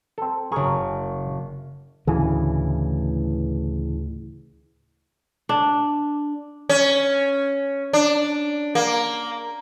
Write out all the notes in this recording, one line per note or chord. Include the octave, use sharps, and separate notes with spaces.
C4 A4
F#1 G#4 A#4 G#5 C#6
D2 A2 C#3 E3
D4
C#4
D4
A#3